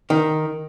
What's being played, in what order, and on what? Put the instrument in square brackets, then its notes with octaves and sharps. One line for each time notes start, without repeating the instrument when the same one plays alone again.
[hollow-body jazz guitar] D#3